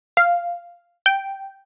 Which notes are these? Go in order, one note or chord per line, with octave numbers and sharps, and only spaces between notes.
F5
G5